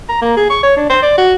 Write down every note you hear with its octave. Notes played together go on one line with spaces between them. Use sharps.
A#5
A#3
G#4
C#6
C#5
D4
C5
D5
F#4